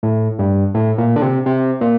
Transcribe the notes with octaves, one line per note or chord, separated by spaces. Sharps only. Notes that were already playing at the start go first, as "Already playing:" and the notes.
A2
G2
A2
A#2
D3
C3
C3
A#2